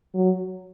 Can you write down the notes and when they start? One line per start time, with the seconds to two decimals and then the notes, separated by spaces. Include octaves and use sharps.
0.14 F#3